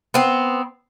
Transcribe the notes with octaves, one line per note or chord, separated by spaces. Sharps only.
B3 C4